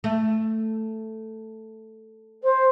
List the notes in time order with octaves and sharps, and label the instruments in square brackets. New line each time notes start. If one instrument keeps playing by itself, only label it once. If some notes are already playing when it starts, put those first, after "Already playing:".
[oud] A3
[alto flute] C5